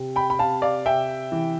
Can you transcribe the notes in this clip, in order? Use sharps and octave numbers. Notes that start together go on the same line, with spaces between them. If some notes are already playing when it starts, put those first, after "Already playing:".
Already playing: C3
G5 B5
B5
C3 F5 A5
D5 F5
C3 E5 G5
E3